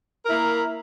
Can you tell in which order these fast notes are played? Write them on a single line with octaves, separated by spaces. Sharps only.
A#4 E4 A#3